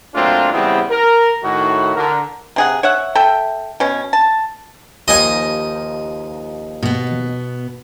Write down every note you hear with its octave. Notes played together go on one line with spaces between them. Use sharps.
A#2 F#3 A3 C4 D4 F4
E2 C#3 G3 B3 C4 E4
A#4
A2 D#3 F#4
D3 A#4
C3 G#4 F#5
C#5 E5 F#5
A4 E5 G5
B2 C#4
A5
D#2 F3 D#4 D#5 G#5 D#6
B2 B3